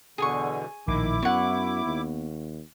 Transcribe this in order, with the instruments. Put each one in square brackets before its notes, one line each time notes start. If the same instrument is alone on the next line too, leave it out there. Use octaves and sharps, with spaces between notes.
[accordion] E2 B2 D3 [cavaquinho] G#4 G#5 C#6
[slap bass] A#1 A2 [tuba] D#3 [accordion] E4 D6
[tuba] F#2 [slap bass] B3 [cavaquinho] C#5 F#5
[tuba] D#2